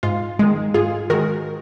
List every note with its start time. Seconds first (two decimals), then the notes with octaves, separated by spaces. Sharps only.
0.03 G#2 F4
0.39 D#3 G#3
0.74 G#2 F4 G#4
1.10 D#3 G#3 F#4 A#4